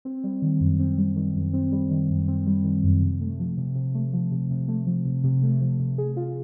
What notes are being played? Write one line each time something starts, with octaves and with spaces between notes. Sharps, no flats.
C4
G3
D#3
F#2
C4
G3
D#3
F#2
C4
G3
D#3
F#2
C4
G3
D#3
F#2
C3
A3
F3
C3
C3
A3
F3
C3
C3
A3
F3
C3
C3
A3
F3
C3
G#4
F4